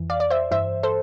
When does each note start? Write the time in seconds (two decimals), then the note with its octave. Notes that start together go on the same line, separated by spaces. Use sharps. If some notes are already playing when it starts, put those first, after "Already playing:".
Already playing: F2 E3
0.10 D5 F5
0.20 D5
0.30 C5 E5
0.51 G2 E3 C5 E5
0.83 A4 C5